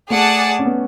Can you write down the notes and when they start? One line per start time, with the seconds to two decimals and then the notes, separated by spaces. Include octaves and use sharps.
0.10 A3 G#4 D5 F#5 A5
0.59 C#4
0.65 B3